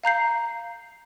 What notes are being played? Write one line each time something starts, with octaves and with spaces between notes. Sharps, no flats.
F5 A#5 G6 C7